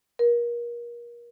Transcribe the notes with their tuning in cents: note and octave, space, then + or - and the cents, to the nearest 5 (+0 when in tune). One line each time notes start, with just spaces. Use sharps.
A#4 +30